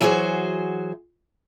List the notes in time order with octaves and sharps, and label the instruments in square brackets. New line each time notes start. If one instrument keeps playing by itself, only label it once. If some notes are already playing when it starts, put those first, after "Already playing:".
[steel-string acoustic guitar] E3 F#3 F#4 G#4 C5